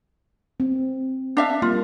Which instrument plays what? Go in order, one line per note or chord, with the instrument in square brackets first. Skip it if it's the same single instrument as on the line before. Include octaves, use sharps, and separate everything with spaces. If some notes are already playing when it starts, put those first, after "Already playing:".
[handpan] C4
[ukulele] D4 E5 F5
[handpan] G3 A#3 [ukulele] F4